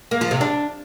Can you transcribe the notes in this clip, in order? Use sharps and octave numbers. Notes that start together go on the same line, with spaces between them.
A#3
F3
C3
D4